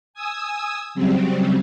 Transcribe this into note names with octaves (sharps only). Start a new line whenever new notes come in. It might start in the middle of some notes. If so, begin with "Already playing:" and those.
G#5 D#6 E6
C#3 F#3 G3 C4